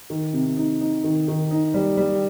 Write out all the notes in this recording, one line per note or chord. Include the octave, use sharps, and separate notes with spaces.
D#3
C3
D#4
D#4
D#3
D#3
D#4
G3
G3